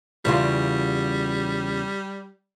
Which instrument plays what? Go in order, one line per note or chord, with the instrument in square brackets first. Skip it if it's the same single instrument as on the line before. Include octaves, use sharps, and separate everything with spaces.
[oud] E2 C#3 F4 [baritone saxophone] G3